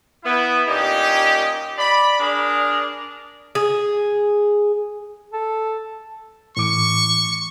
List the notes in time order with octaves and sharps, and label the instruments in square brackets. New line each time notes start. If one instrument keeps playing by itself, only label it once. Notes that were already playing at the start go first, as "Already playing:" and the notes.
[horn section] B3 E4
A#2 C#4 D#4 G4
D5 B5
D4 G#4 A#4
[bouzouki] G#4
[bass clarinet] A4
[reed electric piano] A2 E3 D6 [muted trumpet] C#6